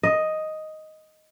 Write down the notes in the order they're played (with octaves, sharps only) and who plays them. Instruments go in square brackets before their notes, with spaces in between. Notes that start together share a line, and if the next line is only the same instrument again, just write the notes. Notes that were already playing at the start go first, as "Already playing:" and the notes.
[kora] D#5